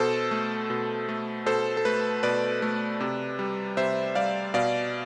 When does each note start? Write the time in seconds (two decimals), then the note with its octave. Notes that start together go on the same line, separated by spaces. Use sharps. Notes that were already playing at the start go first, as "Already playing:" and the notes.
Already playing: B2 A4 C5
0.31 A3
0.70 B2
1.09 A3
1.46 B2 A4 C5
1.77 A4
1.85 A3 B4
2.23 B2 B4 D5
2.62 A3
3.00 C3
3.39 G3
3.77 C3 C5 E5
4.15 G3 D5 F5
4.54 B2 D5 F5